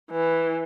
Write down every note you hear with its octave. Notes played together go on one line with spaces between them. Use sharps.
E3